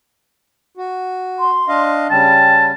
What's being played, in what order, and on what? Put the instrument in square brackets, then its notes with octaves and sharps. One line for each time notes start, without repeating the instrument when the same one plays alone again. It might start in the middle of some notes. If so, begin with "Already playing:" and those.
[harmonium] F#4
[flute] C6
[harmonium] D4 D#5 F5
[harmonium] C#3 G3 C#4 [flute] G5 [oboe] A5